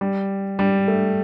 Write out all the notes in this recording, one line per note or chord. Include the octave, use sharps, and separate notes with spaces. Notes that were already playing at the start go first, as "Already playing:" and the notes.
G3
G3
A3